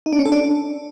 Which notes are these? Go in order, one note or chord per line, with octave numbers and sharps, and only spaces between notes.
D#4
D4
C#4
A4
D4